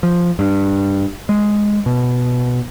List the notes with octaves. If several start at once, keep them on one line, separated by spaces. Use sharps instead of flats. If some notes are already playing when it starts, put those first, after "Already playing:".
F3
G2
G#3
B2